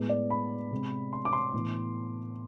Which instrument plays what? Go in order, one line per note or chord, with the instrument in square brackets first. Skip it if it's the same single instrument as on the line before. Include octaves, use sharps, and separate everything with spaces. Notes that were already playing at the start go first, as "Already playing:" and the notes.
Already playing: [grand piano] A2 G#3 B3
D5
B5
C3 G#3 C4
C6
D6
C6
A2 E3 B3